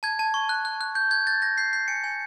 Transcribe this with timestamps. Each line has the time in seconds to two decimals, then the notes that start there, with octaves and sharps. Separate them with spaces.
0.03 A5 G#6
0.19 A5
0.34 C#6
0.49 F#6
0.65 F#6
0.81 F#6
0.95 G6
1.11 G6 G#6
1.27 G6 A6
1.42 G6 A#6
1.58 G6 C7
1.73 G6 C7
1.88 G#5 C#7
2.04 G#5